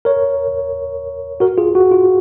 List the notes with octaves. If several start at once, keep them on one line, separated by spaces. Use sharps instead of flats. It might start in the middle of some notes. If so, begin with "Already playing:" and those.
A#4 C#5
F#4 A#4
F4 G#4
F#4
F4